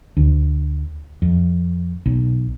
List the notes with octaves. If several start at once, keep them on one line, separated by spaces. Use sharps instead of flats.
D2
F2
B1